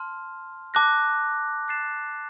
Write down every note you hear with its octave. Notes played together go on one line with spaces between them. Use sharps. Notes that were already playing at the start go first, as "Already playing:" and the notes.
Already playing: A5 C6 F6
A5 D6 F#6 A#6
F#6 A6 C7 E7